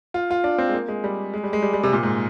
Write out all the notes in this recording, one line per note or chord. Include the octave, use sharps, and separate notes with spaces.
F4
F4
D4
C4
G#3
A#3
G#3
G3
G#3
G3
G#3
G3
G3
C3
A#2
G#2